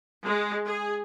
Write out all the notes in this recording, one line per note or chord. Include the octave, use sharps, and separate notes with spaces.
G#3
G#4